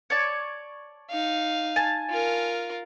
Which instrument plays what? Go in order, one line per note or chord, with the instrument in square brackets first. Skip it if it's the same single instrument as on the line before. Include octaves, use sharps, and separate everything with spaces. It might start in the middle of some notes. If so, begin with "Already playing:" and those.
[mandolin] C#5 D5 A5
[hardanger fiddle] D#4 F5
[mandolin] G#5 A5
[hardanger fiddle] F4 A#4